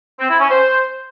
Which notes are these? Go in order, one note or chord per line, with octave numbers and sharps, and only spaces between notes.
C4
E4
C#4
C5